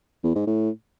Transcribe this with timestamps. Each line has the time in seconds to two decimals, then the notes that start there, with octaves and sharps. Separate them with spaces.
0.24 E2
0.35 G#2
0.47 A2